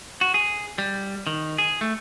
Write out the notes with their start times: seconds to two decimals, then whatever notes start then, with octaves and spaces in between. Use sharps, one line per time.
0.21 F#4
0.34 G#4
0.78 G3
1.27 D#3
1.58 G#4
1.81 A3